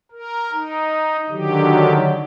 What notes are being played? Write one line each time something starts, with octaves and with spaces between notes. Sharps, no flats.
A#4
D#4
D3 D#3 F#3 G4